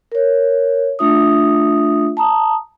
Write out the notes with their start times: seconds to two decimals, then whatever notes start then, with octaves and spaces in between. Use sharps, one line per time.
0.12 A#4 C#5
0.99 A3 D4 F4 E5 D#6
2.17 A5 A#5 D#6